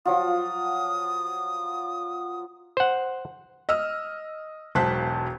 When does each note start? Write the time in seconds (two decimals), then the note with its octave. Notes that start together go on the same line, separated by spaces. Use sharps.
0.06 F3 F#3 F4 D#6
2.77 C5 F#5
3.69 D#5 E6 F6
4.75 E1 B1 C5 A5 F#6 B6